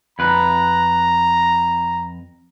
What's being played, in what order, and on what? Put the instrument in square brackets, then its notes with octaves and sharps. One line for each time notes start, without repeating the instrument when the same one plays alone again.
[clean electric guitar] F2 B4 [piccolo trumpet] A#5